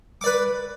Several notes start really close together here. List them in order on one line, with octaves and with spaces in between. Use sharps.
D6 D5 B4